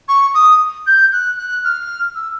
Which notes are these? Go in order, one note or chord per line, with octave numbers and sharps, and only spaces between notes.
C#6
D#6
G6
F#6
F#6
F6
E6